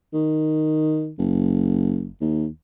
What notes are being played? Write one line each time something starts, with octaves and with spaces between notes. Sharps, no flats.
D#3
F#1
D#2